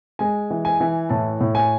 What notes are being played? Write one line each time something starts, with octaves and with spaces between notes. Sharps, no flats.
G#3 G#5
E3
G#5
E3
A2 A5
A2
G#5